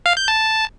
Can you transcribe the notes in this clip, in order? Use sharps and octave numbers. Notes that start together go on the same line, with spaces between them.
F5
G6
A5